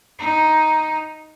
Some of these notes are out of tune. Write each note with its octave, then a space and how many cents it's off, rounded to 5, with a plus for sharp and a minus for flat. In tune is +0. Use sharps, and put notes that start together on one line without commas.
D#4 +5